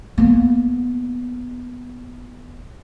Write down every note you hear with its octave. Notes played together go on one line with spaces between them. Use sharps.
A#3 B3